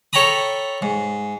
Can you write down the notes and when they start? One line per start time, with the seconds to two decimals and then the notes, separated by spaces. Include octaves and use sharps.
0.13 A4 C#5 G5 A#5 B5 D#6
0.82 G#2